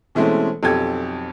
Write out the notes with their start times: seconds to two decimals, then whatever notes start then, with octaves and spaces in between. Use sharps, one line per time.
0.15 B2 E3 G#3 A3 C4 C#4
0.63 B1 F2 G4 A4 G#6